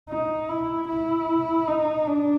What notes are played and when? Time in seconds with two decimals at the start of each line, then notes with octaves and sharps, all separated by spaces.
0.09 D#4
0.49 E4
0.89 E4
1.68 D#4
2.07 D4